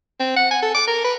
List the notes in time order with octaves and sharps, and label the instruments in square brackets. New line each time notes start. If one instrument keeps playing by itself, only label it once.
[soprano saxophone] C4
F#5
G#5
A4
D6
A#4
B4